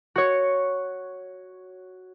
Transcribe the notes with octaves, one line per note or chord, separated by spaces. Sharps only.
F#4 C#5